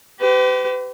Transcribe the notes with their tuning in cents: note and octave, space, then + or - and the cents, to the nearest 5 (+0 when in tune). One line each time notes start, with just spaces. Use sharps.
G4 -30 B4 +40